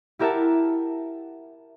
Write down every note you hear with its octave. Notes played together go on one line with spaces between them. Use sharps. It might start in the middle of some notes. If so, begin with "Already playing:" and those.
E4 G4 A#4 E5 F#5 A5